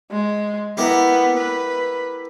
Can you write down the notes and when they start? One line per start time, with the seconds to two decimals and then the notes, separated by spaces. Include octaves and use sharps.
0.12 G#3
0.77 B3 E4 G4 A#4
1.37 B4